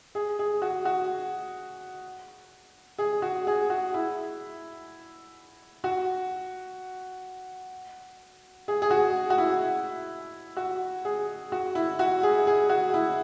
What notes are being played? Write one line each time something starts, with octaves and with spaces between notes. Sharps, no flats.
G#4
G#4
F#4
F#4
G#4
F#4
G#4
F#4
E4
F#4
G#4
G#4
F#4
F#4
E4
F#4
G#4
F#4
E4
F#4
G#4
G#4
F#4
E4